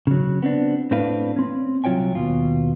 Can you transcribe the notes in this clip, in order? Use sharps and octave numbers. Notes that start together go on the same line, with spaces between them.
C#3 F#3
B3 C4 D4
A2 C4 D4 B4 F5
C4 C#4
C2 F#3 F4 C#5 G5 G#5
D#2 B2 F4